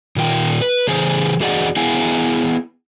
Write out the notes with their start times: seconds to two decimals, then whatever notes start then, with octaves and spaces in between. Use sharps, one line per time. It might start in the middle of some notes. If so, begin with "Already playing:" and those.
0.16 A#2 D#3 F4 G5
0.61 B4
0.87 C#3 E3 G#4 C5 G#5
1.40 E2 F#4 G#4 D5 D#5 F#5
1.76 B3 E4 G#4 F5 G#5